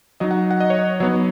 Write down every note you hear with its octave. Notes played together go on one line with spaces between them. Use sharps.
F#3 D#4 D#5
F#5
F#5
D#5
C#5
D#5
F#3 B3 D#4 C#5